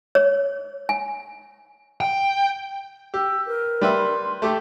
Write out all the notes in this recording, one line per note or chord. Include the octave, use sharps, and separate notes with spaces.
C#5
G#5
G5
G4 E6
A#4 B4
G3 B4 E5 C6
A3 G4 A4 D6